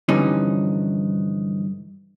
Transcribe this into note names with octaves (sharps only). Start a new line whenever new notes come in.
G2 D3 E3 F3 C#4 D#4